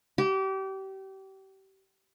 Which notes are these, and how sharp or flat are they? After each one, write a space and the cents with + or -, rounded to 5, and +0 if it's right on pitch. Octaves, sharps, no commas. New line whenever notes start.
G4 -30